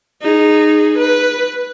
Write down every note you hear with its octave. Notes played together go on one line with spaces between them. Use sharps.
D#4 G#4
B4